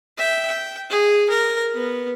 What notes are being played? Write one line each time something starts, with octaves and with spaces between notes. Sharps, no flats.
E5 G5
G5
G#4
A#4
B3